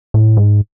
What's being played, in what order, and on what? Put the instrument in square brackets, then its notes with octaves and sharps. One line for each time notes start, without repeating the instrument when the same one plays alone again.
[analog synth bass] A2
G#2